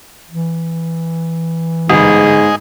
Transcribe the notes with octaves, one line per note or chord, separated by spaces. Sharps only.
E3
G1 G#2 G#4 D#5